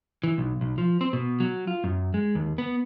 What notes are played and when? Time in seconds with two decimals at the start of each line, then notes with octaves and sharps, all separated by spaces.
0.24 E3
0.38 B1
0.61 B1
0.78 F3
1.01 C4
1.13 B2
1.40 F#3
1.67 F4
1.84 F#2
2.14 G#3
2.35 D#2
2.58 B3